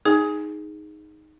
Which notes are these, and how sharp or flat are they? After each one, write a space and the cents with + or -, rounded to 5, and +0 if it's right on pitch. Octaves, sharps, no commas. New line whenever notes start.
D#4 +0 G#4 +0 G#5 +0